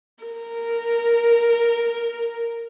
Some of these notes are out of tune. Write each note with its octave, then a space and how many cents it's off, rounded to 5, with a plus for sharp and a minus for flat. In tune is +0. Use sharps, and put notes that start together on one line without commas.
A#4 -10